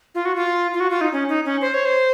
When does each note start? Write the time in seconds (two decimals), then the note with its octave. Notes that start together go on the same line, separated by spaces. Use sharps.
0.15 F4
0.25 F#4
0.36 F4
0.73 F4
0.80 F#4
0.91 F4
1.01 D#4
1.13 C#4
1.29 D#4
1.45 C#4
1.61 C5
1.74 C#5
1.85 C5